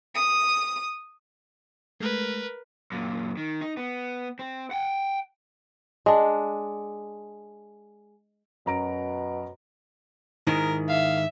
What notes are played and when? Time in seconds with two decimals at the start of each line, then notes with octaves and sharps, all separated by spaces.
0.15 D#6
2.00 G#3 A3 A#4 B4
2.92 F#2 A#2
3.37 D#3
3.61 D#4
3.77 B3
4.39 C4
4.71 F#5 G5
6.06 G#3 D4
8.66 F#2 B2 A#5 D7
10.47 G#2 D#3 E4 A#4
10.89 E5 F5